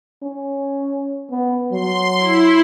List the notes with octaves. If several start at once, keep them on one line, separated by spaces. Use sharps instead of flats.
C#4
B3
F#3 C6
E4